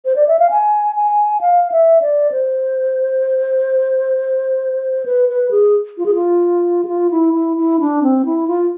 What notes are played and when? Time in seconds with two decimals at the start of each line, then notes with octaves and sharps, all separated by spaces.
0.05 C5
0.16 D5
0.28 E5
0.39 F5
0.51 G#5
0.96 G#5
1.41 F5
1.72 E5
2.02 D5
2.32 C5
5.06 B4
5.29 B4
5.51 G#4
5.98 F4
6.06 G#4
6.15 F4
6.85 G#4
6.88 F4
7.11 E4
7.34 E4
7.57 E4
7.80 D4
8.03 C4
8.25 E4
8.48 F4